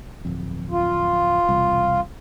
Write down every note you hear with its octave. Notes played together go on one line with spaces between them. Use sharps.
D1 F2
F4
E1 C2